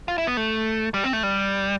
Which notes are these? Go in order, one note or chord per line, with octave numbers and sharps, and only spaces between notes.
F4
E4
B3
A3
G3
C4
A3
G3